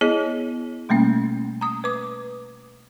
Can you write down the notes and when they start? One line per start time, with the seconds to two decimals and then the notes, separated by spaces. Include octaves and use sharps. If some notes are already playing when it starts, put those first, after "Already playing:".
0.01 B3 E4 G#4 C#5 D#5
0.89 B2 G3 A3 A#3 C#4
1.61 A#5 D#6
1.84 B4 D6 D#6